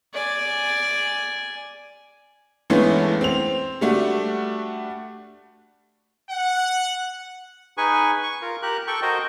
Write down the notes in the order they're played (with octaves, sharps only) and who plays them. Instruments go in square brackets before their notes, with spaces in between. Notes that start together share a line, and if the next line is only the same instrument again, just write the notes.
[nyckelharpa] D5 G#5
[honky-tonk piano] G2 E3 G#3 A3 B3 C#4
C4 F7
G3 A3 D4 F#4
[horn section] F#5
[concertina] D#4 G#4 B4 G#5 C#6
C#6
F4 A#4
G4 A#4 F#6
A4 G5 C#6
F#4 A#4 C5 D#5 G5